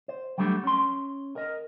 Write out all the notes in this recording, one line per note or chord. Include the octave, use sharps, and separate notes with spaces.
C5
F#3 G3 A3 D4 G4
C#4 C6
A#4 D#5